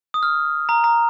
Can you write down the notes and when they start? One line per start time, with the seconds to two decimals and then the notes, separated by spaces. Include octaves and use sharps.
0.14 D#6
0.23 F6
0.69 A#5
0.84 A#5